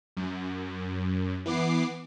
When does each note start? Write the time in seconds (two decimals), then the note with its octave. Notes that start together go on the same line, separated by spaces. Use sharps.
0.17 F#2
1.46 E3 B3 D6 C7